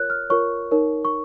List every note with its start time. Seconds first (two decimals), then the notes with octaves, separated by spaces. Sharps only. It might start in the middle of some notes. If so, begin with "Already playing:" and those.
Already playing: F4 A#4 C#5 F#6
0.10 F6
0.30 F4 A#4 C#5 C#6
0.72 D#4 A#4 C#5
1.05 C#6